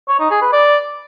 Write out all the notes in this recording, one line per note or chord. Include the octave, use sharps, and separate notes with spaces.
C#5
D#4
G#4
B4
D5